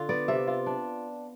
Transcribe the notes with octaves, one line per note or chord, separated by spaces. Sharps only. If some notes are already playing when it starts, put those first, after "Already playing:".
Already playing: D3 F4
B3 D5
C3 E5
F4
D4